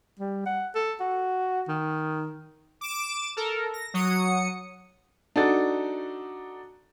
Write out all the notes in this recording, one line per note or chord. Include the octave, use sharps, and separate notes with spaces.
G3
F#5
A4
F#4
D#3
D6 D7 E7
A4 A#4
A#6
F#3 D#6 C#7
D4 D#4 F#4 A4 A6